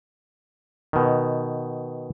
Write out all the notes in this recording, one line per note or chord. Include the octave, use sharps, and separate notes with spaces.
B2 D#3